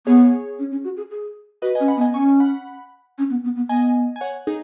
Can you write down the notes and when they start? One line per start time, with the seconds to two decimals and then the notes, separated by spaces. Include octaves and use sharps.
0.06 B3 G#4 C#5
0.59 C#4
0.71 C#4
0.84 F#4
0.97 G#4
1.11 G#4
1.62 F#4 B4 D#5
1.75 D#5 G#5
1.80 C#4
1.88 F#5 B5
1.96 B3
2.01 D#5 G#5
2.13 C#4 G#5 C#6
2.40 F#5 B5
3.18 C#4
3.30 B3
3.44 B3
3.56 B3
3.69 B3 D#5 G#5
4.16 G#5
4.21 C#5 F#5
4.47 D#4 G#4